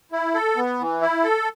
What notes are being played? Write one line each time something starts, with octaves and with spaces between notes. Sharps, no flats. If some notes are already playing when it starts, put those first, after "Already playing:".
E4
A4
B3
E3
E4
A4